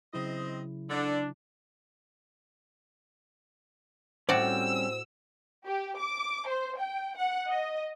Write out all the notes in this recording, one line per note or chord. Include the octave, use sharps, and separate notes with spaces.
C#3 F#3 C4 E4 D#5
D3 D4
A2 G3 C4 C#4 F#4 C5 D5 E6
G4
D6
C5
G5
F#5
D#5